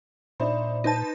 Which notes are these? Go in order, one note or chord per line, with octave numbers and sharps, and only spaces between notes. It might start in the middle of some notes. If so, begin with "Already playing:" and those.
A#2 D4 D#4 C5 D5 E5 B5
D#4 B4 C5 A5 G6